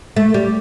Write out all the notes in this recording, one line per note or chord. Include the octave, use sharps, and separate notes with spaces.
A3
G3